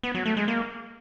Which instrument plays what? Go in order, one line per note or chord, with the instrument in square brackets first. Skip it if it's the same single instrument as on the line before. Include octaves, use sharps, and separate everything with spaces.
[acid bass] B3
F#3
A3
G#3
A#3